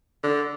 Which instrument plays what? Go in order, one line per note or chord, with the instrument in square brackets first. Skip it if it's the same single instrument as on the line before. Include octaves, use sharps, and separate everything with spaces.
[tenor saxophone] D3